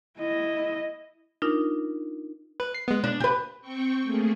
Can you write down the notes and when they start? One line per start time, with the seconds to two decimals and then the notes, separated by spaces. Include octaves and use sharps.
0.19 E4 D#5
1.42 D4 D#4 F4 A#4
2.60 B4
2.75 C7
2.88 G#3 B3
3.04 D4
3.20 G4 B4
3.61 C4 G5 C#6
4.03 A3 A#3 G#4